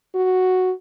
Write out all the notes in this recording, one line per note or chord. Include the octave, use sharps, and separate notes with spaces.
F#4